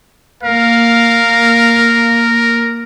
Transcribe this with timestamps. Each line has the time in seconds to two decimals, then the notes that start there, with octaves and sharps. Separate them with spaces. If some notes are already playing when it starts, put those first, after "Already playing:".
0.43 A#3 A#4 F5